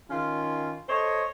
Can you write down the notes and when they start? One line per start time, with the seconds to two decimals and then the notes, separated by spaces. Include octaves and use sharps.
0.10 D#3 C#4 F4
0.89 A4 C5 C#5 D#5